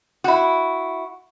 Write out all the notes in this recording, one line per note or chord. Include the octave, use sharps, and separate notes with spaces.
E4 F#4